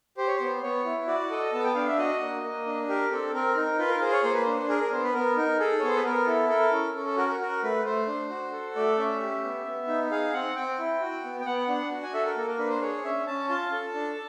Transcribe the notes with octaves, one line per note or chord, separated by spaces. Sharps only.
G4 C5
C#5
B3 C5
B3 C#5
E4
F#4 D5
A4 D#5
B3 A5
G5
D4 F5
E5
F#4 D#5
A#3
A#3
D4
G4 A#4
C4 A4
C4 A#4
D#4 A#4
F4 B4
A#4
G#4 C5
C#5
A#3 C5
B4
D4 C5
G#4 A#4
A#4
B3 C5
B4
B3 A#4
D#4 A#4
G#4 A4
B3 C#5
C5
B4
B3 A#4
E4 A4
A4 A#4
C#4
C#4 A4
A4
F#4 A#4
A#4
F#4 A#4
A3 B4
A3 C5
D4
F#4
A4
A3 D5
C#4 E5
G4
B3
B3
D#4
G#4 F5
C4 F#5
C4 G5
E4
F#4
B3
G5
B3 F#5
D4 F#5
F#4
G#5
A4 E5
A#4
A#3 A4
A#4
D4 B4
C5
G#4 C#5
C#4 E5
C#4 A5
F4 A5
A4
D4